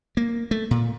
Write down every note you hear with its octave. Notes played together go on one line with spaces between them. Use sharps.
A#3
A3
A#2